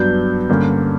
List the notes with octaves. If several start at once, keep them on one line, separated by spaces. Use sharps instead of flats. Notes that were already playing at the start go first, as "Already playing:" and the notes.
Already playing: G2 F#3 B3 D4 G6
G2 D3 A#3 C#4